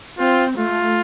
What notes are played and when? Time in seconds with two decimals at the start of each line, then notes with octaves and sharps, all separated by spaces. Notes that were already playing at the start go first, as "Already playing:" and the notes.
0.18 C4 F4
0.57 A3 F4